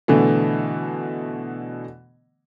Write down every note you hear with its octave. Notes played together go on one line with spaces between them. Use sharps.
B2 D3 E3 A3